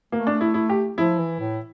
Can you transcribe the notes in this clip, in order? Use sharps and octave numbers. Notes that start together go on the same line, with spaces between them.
A3 A#3
D4
E4
E4
G4
F3 E4
E3
A2